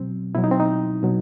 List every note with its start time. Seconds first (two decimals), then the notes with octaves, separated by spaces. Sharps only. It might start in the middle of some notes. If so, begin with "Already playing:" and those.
Already playing: B2 F#3 C4
0.35 B2 F#3 E4
0.44 D#4
0.51 C4
0.60 D#4
1.03 B2 F#3